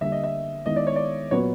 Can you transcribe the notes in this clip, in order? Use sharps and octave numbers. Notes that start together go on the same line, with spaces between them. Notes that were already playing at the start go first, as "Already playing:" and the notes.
D3 G3 A#3 E5
D#5
E5
D#3 G#3 B3 E4 D#5
D5
C#5
D5
A#2 F#3 B3 C#5